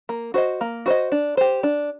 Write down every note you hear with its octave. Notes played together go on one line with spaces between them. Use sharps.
A#3
F#4 C5 D#5
A#3
F#4 C5 D#5
D4
G4 C5
D4